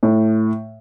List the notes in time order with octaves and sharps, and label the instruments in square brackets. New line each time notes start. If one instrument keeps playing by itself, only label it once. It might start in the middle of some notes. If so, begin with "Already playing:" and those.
[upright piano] A2